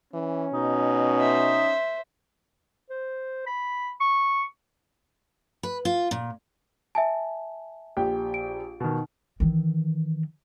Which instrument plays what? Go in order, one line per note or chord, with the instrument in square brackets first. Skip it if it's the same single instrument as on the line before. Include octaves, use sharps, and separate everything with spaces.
[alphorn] E3 [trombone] C#4
[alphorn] B2 [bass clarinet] D#4
[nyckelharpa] C5 E5
[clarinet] C5
B5
C#6
[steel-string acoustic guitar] B4
F4
A#2
[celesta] E5 G#5 A5
[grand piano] A#1 G4 G5
[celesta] D7
[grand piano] B2 D#3
[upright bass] D#3 E3